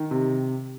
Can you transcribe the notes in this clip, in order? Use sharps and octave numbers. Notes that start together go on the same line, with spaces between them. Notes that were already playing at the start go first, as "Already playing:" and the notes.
Already playing: D#3
C3